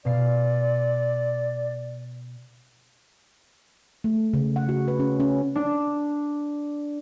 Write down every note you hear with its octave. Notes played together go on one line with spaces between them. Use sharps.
B2 D5 F5 C7
A3
C#3
F#5
F#4
B4
C#4
C#4
D4